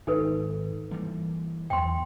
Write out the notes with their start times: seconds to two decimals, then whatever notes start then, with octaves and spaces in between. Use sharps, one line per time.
0.07 G#1 G#2 D#4 A4 B4
0.91 E3 G3 A#3
1.70 E2 E3 F#3 G5 C6